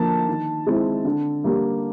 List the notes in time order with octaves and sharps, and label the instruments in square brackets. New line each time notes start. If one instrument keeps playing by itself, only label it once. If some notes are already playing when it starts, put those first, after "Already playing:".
Already playing: [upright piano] D3 F3 A#3 A5
D#3
G#3 C4 E4
D3
G3 A#3